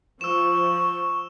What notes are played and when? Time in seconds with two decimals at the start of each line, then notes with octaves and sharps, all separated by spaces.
0.21 F3 C#6 E6 E7